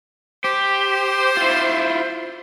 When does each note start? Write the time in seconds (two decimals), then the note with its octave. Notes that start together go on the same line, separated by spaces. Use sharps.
0.44 G4 C5
1.37 E4 F4